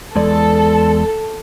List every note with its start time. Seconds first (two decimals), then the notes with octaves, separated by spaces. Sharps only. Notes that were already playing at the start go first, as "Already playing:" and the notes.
0.16 E2 G#3 A4 D5